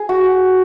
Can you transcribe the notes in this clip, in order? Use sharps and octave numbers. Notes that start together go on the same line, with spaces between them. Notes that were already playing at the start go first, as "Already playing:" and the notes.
Already playing: G#4
F#4